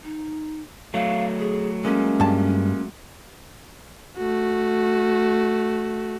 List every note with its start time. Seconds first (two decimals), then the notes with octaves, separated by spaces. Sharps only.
0.04 D#4
0.94 F#3 A3 F5
1.39 G#4
1.85 G#3 A#3 C#4
2.20 G2 A5
4.17 A3 F#4